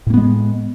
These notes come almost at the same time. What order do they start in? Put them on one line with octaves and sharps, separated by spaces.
A2 A#3 B3 G#3